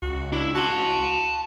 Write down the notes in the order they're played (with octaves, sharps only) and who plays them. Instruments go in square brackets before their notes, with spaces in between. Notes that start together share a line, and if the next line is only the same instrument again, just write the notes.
[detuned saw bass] C#2 [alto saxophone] F#4
[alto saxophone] D4 [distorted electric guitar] E4
[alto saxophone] F#4 [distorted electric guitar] A5 C6